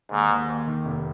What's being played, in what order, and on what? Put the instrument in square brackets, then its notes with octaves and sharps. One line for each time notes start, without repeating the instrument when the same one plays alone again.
[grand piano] D#2 [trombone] G#2
[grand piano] D#2
D#2
D#3
F1